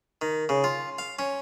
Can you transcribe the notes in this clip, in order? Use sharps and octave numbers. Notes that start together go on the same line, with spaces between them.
D#3
C#3
F4
F5
C#4